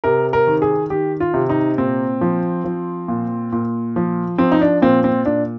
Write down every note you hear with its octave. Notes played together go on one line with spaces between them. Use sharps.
C3 A#4
A#4
D#3
G#4
D#3 G4
F4
C3
D#4
A#2 C4
F3
F3
A#2
A#2
F3
F3 C4
D#4
D4
A#2 C4
C4
A#2 D4